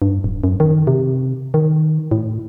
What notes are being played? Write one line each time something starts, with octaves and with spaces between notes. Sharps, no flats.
G2
D1
F#2
D#3
C3
D#3
A2